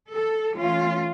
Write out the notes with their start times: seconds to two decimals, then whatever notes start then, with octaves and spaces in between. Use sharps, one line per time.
0.11 A4
0.57 E3 A3 C#4 F4